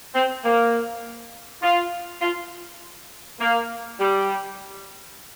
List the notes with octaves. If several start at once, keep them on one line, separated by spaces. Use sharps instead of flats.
C4
A#3
F4
F4
A#3
G3